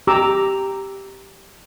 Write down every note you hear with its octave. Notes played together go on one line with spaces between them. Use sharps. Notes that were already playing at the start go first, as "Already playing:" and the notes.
G4 A#5 D6 E6